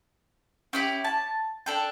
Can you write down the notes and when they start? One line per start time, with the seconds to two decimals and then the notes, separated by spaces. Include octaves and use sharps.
0.73 C#4 E4 G4 G5
1.04 A5
1.66 D4 A4 G5